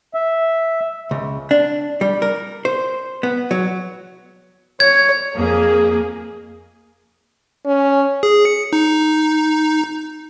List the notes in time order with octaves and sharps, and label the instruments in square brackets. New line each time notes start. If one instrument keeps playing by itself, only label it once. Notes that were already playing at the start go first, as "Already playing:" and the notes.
[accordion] E5
[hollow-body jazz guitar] C#2
D4
G3
A#4
C5
B3
F#3
[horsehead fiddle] C#5 [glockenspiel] G#6
[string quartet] F2 [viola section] A#3 G#4
[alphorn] C#4
[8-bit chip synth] G#4
C#7
D#4